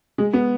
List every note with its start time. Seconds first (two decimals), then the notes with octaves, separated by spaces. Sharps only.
0.18 G#3
0.33 B3